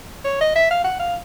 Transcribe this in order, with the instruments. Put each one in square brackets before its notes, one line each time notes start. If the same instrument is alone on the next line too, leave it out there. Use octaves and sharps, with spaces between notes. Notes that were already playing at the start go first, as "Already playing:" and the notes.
[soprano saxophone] C#5
D#5
E5
F5
F#5
F5